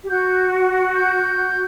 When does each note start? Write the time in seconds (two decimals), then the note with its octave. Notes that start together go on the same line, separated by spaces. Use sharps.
0.03 G4
0.10 F#4 G6
0.95 G6